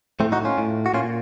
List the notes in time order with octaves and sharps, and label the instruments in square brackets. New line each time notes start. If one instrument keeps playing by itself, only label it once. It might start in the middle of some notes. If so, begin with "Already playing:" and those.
[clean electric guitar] A2 A3 C4
D#4 F#4
C#4 F4
A2
F#4
A#2 C#4 F4